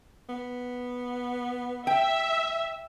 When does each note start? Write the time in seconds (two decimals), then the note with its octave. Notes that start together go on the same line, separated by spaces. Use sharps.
0.29 B3
1.87 E5 G5